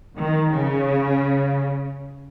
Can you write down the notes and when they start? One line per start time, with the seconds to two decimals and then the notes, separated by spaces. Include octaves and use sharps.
0.17 D#3
0.53 C#3